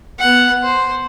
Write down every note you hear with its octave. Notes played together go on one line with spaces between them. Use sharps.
B3 F#5
C5